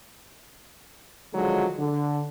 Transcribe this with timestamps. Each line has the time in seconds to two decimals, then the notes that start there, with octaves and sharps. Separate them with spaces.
1.34 D3 D#3 F3 F#3 G#3
1.79 D3